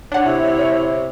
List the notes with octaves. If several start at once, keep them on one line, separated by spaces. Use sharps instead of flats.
D4 C#5 F#5
C3 E4